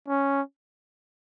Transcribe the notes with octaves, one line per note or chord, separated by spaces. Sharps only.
C#4